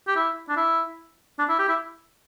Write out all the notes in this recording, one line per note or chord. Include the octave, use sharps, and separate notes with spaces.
G4
E4
D4
E4
D4
E4
G4
E4